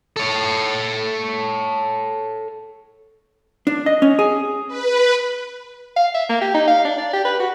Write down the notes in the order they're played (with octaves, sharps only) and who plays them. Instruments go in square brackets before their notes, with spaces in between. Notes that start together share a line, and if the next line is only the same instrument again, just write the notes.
[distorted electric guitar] A4 C#5
[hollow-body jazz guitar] D4
D#5
C#4
G#4
[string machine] B4
[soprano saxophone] F5
E5
A#3
G4
D#4
F5
D4
D5
G4
B4
F#4